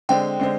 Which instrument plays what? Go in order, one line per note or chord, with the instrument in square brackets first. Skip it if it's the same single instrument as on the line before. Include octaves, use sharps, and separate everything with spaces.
[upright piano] D3 G#3 C4 [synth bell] G5
[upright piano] D3 G#3 C4